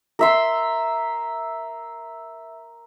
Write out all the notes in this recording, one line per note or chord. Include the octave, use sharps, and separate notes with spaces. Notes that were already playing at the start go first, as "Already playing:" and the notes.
A#4 E5 C6